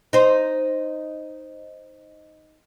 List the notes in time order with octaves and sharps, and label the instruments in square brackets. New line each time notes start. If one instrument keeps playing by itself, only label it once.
[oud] D#4 C5